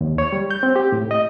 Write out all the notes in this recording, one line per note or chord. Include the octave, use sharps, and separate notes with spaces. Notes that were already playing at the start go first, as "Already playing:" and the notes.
D#2
C#5
G3
G6
C4
G4
A2
D#5